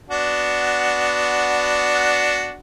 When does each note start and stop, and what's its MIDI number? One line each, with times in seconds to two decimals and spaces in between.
0.10 2.57 59
0.10 2.57 62
0.10 2.57 66